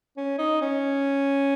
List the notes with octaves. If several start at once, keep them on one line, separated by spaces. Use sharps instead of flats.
C#4
D#4
C#4